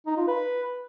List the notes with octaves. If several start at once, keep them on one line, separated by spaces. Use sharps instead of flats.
D#4
F4
B4